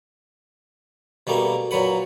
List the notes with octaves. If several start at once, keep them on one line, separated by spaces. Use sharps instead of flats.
B2 G3 A3 A#3
A#2 F#3 B4 F#5